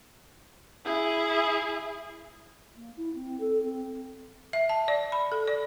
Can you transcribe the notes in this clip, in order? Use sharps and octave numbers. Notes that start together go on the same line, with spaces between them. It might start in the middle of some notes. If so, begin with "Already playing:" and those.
E4 G#4
A#3
E4
C4
A4
C4
E5
A5
D5
B5
A4
D5